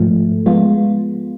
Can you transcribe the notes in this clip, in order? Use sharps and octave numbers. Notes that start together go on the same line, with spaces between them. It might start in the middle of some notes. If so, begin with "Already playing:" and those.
Already playing: G#2 F3 A3
F3 G#3 B3 F4